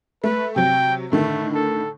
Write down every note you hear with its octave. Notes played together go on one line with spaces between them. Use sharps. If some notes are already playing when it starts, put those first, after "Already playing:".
A3 B4
C3 F#3 G5
A2 D3 D#3 A3
A4